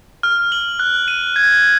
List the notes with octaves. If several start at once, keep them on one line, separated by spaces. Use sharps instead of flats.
F6
F#7
F#6
D#7
G#6